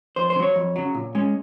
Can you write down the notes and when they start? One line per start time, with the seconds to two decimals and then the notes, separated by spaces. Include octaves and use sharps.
0.16 F2 C5
0.30 C5
0.36 C#3
0.40 F#3 C#5
0.56 F2
0.76 C#3 F#3
0.95 A#2
1.15 G#3 C#4